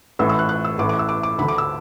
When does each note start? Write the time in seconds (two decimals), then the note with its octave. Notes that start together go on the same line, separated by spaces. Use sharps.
0.19 A1 A2 E3 E6
0.29 E6
0.39 F#6
0.49 F#6
0.65 E6
0.78 A1 A2 E3 D6
0.89 D6
0.99 E6
1.09 D6
1.23 D6
1.38 D2 B5
1.43 D3
1.48 D6
1.58 E6